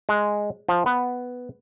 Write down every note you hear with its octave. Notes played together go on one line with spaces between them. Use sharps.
G#3
F3
B3